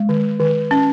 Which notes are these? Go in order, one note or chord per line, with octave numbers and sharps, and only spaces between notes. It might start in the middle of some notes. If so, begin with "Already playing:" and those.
Already playing: G#3
D#3
D#3
C#4